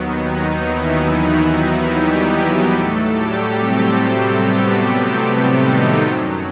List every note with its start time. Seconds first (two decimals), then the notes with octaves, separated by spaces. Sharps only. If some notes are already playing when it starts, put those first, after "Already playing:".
Already playing: D#2 D#3 F#3 B3
0.24 D#3 D#4
0.65 E3 E4
1.06 D#3 D#4
1.48 E3 E4
1.89 G3 G4
2.71 A2 F#3 A3 A4
3.12 G3 G4
3.54 C3 C4
3.95 C3 C4
4.37 B3
4.77 B3
5.60 D#3 D#4
6.01 F#2 F#3